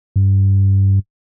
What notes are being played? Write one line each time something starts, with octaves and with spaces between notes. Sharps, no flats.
G2